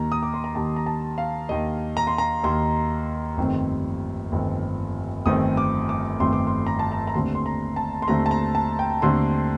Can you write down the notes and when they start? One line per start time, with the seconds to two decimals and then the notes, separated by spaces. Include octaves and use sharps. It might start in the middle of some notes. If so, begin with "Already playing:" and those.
Already playing: D#2 D#3 A#3 A#5
0.12 D#6
0.23 D6
0.34 C6
0.44 A#5
0.55 D#2 D#3 A#3 A5
0.76 A#5
0.86 A5
1.18 F5
1.49 D#2 D#3 A#3 D#5
1.97 A#5
2.07 C6
2.18 A#5
2.44 D#2 D#3 A#3 C6
3.37 G1 F2 D#3 A3 C4
4.32 G1 F2 D#3 A3 C4
5.26 G1 F2 D#3 A3 C4 D#6
5.57 D6
5.89 D6
6.20 G1 F2 D#3 A3 C4 C6
6.33 D6
6.47 C6
6.67 A#5
6.79 A5
6.92 A#5
7.07 A#5
7.14 D#2 D3 A3 C4 C6
7.35 C6
7.46 A#5
7.76 A5
8.02 C6
8.08 D#2 D3 A3 C4 A#5
8.26 A5
8.31 A#5
8.55 A5
8.79 G5
9.02 D#2 D3 A3 C4 C6